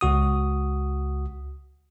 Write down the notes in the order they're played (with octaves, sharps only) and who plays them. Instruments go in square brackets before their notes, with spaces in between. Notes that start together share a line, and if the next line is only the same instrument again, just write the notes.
[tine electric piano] C#2 F#4 D#6